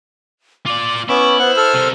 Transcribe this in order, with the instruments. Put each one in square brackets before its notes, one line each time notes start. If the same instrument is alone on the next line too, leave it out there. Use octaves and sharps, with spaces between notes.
[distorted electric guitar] F4 D5 [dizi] D6
[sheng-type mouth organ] B3 C#4 D6 [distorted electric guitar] E4 [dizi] C#6
[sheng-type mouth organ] B3 F#5 [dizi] C5
[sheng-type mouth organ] A4 E6 F6
[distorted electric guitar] C3 A#4